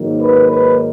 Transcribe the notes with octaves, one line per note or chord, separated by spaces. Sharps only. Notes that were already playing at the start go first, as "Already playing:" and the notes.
Already playing: G#2 D#3 F#3 A#3
B4
B4